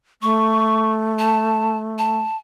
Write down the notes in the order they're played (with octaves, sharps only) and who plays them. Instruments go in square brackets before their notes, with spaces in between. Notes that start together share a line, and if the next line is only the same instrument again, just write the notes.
[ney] A3 [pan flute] C#6
[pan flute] A5
A5